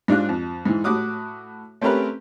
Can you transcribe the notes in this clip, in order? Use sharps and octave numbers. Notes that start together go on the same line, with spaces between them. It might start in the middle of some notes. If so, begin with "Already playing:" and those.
G#2 D4 F4 F#6
F2
G#2 E3
A2 F#4 D6 D#6 F#6
A3 C4 C#4 G4 A#4 B4